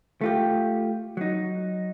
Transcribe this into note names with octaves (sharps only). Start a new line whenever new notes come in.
A3 F4 G4
F#3 D#4